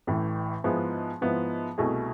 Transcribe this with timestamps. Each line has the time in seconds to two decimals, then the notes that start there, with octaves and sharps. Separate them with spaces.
0.07 A1 A2 E3
0.64 G#2 F3 B3 E4 G#4
1.21 G#2 F3 B3 E4
1.78 C2 B2 A3 E4 G#4